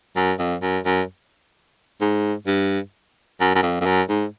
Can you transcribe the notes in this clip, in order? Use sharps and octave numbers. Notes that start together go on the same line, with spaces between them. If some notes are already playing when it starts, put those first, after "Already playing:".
F#2
F2
F#2
F#2
G#2
G2
F#2
F#2
F2
F2
F#2
G#2